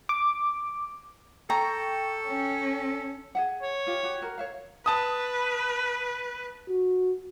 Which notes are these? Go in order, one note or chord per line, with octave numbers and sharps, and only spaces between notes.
D6
A4 G5 A#5 C#6
C#4
G#4 E5 F#5
C#5
F4 G4
F#4 G4
F#4 A#4
C#5 E5 F5
B4 A5 D#6
F#4